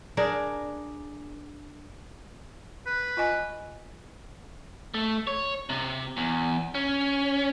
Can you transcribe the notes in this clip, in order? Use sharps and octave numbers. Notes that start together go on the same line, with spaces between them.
D4 G#4 A#4
B4
F4 D#5 G#5
A3
C#5
C3
E2
C#4